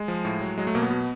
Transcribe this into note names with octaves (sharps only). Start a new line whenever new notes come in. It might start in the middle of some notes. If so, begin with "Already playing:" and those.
Already playing: G#3
F3
A2
F#3
F#3 G#3
A3
B2 A#3
B3
B2